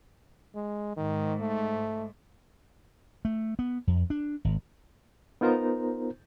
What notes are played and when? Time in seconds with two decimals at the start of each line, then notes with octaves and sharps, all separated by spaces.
0.55 G#3
0.97 G#2 D#3
1.40 A3
3.25 A3
3.59 B3
3.87 F2
4.10 D4
4.45 G#1
5.41 B3 D#4 F4 A#4 C5 A#5